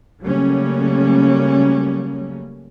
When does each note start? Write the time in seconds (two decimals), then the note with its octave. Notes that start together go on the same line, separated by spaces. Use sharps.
0.21 C#3 F#3 G3 A3 A#3 C#4